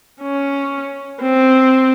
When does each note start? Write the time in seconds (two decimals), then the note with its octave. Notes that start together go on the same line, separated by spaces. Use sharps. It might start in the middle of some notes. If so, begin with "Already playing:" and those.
0.22 C#4
1.21 C4